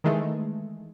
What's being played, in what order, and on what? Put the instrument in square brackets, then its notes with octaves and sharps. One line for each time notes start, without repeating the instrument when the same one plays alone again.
[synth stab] D#3 E3 G#3 A3